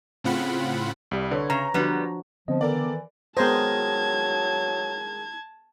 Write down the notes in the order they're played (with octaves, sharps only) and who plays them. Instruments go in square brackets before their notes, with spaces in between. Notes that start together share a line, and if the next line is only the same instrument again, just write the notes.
[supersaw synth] A2 C#3 C4 F4 F#5 B5
[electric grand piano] C2 G3
[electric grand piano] D3 [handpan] B4 C#5
[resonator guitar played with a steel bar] C#3 [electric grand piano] A#5
[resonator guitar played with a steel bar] D3 G3 B3 [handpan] F3 D4 F#4
[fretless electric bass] D3 [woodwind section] F3 [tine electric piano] B3 C4 D#5
[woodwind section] D#3 E3 [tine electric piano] B3 [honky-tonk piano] A4 A#4 D5
[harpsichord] D#3 G#3 D#4 [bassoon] F#3 [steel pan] B3 C5 [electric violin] A5 G#6